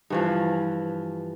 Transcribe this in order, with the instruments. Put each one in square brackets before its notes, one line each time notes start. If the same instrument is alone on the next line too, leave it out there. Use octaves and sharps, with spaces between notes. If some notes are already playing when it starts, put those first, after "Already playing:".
[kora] G2 E3 F3